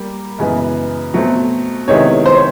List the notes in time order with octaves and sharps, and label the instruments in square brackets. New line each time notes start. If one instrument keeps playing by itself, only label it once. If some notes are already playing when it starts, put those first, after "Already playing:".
Already playing: [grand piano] G3 A#3
F#2 C#3 E3 G#3 B3
B2 F#3 A3 C4
[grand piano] C3 D#3 G#3 B3 E4 [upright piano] C#5
[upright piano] C5
C#5